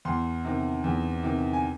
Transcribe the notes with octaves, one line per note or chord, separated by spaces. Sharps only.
E2 C6
C3 D#3
E2
C3 D#3
G#5